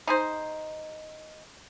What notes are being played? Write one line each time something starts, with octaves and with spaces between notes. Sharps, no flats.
D#4 G#4 C5